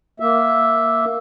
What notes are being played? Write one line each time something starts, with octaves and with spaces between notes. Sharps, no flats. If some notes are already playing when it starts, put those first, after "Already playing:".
A#3 E5